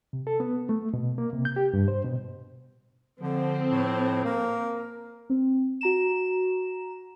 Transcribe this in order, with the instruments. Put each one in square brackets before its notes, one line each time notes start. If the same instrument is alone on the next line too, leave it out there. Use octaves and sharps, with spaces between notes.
[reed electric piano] C3
A4
B3
A3
B2
A#3
C3
G6
G4
G2
C5
B2
[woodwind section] F2 F3 [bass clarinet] D3 [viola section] C4
[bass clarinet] A2
[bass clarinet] A#3 [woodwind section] A#4
[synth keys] C4
F#4 A#5 E7